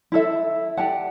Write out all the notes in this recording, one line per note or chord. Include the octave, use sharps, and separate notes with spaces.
E4 A4 E5
G4 D5 F#5 A5